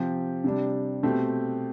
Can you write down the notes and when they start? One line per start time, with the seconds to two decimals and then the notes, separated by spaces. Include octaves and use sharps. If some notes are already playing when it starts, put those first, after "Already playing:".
Already playing: C3 F3 C4 G4
0.44 C3 G3 D4
1.03 B2 A3 C4 G4